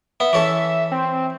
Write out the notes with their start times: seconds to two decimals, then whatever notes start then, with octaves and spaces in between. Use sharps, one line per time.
0.20 B3 E5
0.33 E3 C#4 A4
0.92 C4